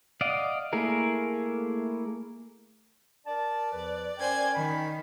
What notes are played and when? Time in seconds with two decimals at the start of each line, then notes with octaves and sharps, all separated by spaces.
0.21 D5 D#5 F5 F#5
0.73 A3 A#3 E4 G#4 A#4
3.26 A#4 D5 A5
3.73 E2 F3 B4
4.18 C#4 A#4 C5 G5 G#5 G#6
4.55 D#3 B5